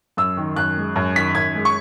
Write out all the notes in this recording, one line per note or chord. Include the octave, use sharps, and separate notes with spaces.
F#2 E6
D#3
F#2 F#6
G#3
F#2
D#3 B6
F#2 G#6
G#3
C#6